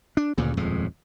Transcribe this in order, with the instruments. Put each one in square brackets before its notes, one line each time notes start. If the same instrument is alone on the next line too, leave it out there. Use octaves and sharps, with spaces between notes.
[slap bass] D4
D2 G2 A#2 C#3
D#1 F2 A2 G#3